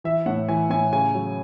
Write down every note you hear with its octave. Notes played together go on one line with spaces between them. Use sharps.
E3 E5
A2 F#5
E3 G#5
A2 G#5
C#3 G#5
F#3